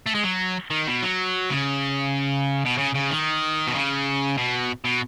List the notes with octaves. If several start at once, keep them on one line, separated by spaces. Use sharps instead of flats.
A3
G#3
F#3
D#3
B2
F#3
C#3
B2
C#3
C#3
D#3
B2
C#3
B2
B2